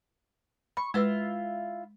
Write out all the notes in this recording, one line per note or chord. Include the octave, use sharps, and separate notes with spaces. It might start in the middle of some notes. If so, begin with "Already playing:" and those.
B5 C#6
G#3 E4 F4 B4 E6